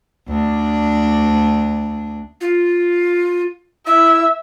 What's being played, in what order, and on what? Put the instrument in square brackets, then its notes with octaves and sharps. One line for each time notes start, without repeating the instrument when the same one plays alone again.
[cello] D2 D4
[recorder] F4
[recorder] E4 [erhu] E5